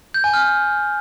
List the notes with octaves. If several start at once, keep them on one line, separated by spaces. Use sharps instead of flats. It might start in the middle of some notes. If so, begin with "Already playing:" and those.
G6
G#5
F6